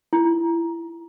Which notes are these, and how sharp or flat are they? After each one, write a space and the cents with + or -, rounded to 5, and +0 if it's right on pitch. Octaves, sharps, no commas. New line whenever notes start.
E4 +25